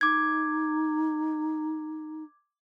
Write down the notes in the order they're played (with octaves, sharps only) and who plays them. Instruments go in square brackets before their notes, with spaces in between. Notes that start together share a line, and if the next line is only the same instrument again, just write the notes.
[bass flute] D#4 [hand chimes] D6 G#6